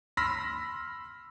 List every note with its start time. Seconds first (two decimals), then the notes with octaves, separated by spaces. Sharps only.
0.17 B5 C6 E6 F6 A#6 B6